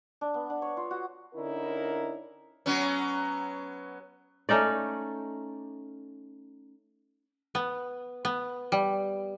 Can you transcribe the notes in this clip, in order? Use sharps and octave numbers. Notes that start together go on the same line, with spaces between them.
D4
B3
D4
C#5
F4
F#4
D3 C#4 D#4 E4 A#4
F#3 B3 C#4
A3 C#4 D#4 D5
B3
B3
G3